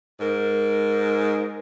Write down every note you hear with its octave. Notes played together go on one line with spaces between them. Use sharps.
G#2 A#4